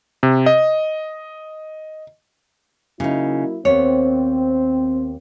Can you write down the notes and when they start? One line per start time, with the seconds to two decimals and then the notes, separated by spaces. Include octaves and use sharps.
0.23 C3
0.46 D#5
3.00 C#3 F#3 A#3 D#4 E4
3.65 D#2 B3 C4 C#5